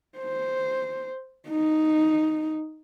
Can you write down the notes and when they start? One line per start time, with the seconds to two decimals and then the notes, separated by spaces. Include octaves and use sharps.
0.18 C5
1.49 D#4